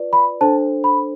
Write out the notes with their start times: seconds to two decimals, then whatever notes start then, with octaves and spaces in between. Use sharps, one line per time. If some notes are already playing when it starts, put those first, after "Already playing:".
Already playing: F4 B4 D5
0.13 B5
0.41 D4 A4 C5 A5
0.84 B5